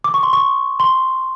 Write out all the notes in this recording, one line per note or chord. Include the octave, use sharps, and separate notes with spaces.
D6
C#6
C6
C#6
C6